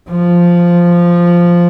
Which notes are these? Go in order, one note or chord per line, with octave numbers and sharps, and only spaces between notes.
F3